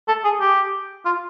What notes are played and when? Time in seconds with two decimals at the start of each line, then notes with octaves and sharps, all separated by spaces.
0.08 A4
0.24 G#4
0.40 G4
1.05 F4